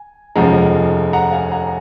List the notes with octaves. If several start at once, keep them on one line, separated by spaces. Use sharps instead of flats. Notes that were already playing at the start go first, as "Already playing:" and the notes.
Already playing: G#5
F1 D#2 C#3 F3 G#3 F#5 A#5
F#5 A#5
F5 G#5
F#5 A#5